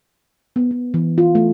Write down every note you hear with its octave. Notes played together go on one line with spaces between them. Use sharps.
B3
B3
E3
F4
A3